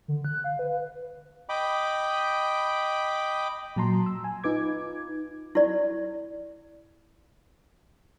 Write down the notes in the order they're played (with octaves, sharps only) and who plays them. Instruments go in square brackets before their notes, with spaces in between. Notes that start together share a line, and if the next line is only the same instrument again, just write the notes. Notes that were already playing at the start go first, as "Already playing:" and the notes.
[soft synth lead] D3
F#6
F5
B4
[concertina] D#5 G5 B5 D6
[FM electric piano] A#2 F#3 A5 A#5 C6
E6
G#5
D#4 F4 B4 D6 G#6
[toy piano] E4 D5